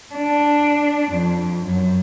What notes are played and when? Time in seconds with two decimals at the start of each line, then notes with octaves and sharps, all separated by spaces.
0.14 D4
1.12 F2
1.65 F#2